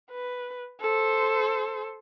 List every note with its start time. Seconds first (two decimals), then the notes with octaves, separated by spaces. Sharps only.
0.11 B4
0.81 A4 C5